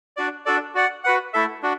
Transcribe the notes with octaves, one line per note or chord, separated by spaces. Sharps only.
D4 F#4 D5
D4 F#4 A4 D5
F#4 D5 F#5
F#4 B4 F#5
A3 E4 A4 E5
D4 F#4